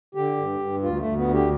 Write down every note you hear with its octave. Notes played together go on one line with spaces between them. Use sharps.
D3 G4
G2
G2
D2 F4
A3
D2
B3
D3
G4